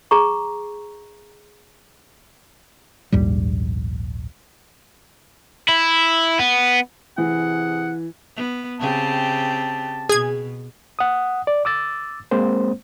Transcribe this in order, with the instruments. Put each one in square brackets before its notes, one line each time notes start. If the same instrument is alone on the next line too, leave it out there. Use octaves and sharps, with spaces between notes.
[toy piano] G#4 A#5 C#6
[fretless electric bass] A#1 D#2 G#2 G3
[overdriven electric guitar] E4
B3
[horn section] C3 G#4 F#5 [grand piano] E3
[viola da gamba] B3
[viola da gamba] C#3 C4 G4 [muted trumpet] A5
[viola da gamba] B2 [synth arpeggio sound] G#4 G#6
[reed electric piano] F#5 D#6
D5
D6 E6 A6
G#3 A#3 C4 C5